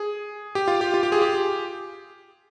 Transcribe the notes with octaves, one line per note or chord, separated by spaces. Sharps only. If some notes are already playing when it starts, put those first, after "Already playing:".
Already playing: G#4
G4
F4
G4
F4
G4
G#4
G4